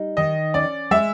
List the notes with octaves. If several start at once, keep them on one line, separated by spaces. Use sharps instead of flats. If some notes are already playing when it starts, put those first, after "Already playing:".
Already playing: G3 D#4
D#3 D#5
C#4 D5
G#3 E5